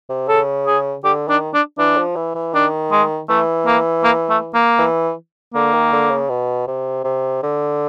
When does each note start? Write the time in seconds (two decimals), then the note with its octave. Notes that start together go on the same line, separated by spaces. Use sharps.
0.09 C3
0.28 C#3 A4
0.67 G#4
1.04 D3 G4
1.28 D#3 D4
1.54 D4
1.78 E3 D4
1.97 F3
2.16 E3
2.35 E3
2.53 D#3 D4
2.91 G#3
3.29 E3 A3
3.66 A#3
4.04 A#3
4.30 A3
4.54 A#3
4.79 E3
5.54 D3 A#3
5.74 D#3
5.92 D3
6.11 C#3
6.29 B2
6.67 C3
7.04 C3
7.43 D3